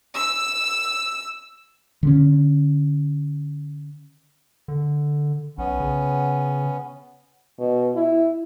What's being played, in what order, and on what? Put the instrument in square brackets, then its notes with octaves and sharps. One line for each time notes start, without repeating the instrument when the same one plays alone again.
[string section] E6
[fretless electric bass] D3 C4 C#4
[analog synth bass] D3
[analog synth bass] B1 [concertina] B3 C#4
[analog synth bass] C#3
[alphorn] B2
E4